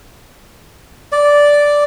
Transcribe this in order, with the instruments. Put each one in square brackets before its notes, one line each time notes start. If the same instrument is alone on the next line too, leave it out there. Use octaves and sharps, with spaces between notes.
[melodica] D5